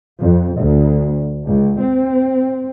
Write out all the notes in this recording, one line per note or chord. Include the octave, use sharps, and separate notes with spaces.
F2
D2
C#2
C4